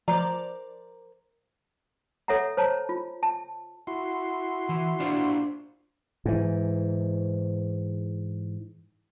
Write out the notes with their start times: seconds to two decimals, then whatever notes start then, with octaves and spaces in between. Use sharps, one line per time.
0.08 F3 A#4 C5 D5 A#5
2.28 A4 C#5 E5 F#5 A#5
2.57 C5 C#5 A5 A#5
2.89 F4
3.23 A5
3.87 E4 F#4 C6
4.69 E3
5.00 D4 F4 C5
6.25 G#2 E3